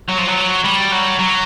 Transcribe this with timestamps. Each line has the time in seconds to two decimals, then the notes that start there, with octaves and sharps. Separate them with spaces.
0.09 F#3
0.19 F3
0.28 F#3
0.65 G3
0.92 F#3
1.19 F#3